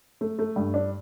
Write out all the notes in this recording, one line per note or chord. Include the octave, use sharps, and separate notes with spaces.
A3
A3
G2
D4